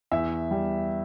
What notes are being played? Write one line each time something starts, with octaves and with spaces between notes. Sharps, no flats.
E2 E5
G3